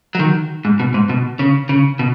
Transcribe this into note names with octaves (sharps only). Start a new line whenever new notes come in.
F#3
D#3
G#2
B2
G#2
B2
C#3
C#3
B2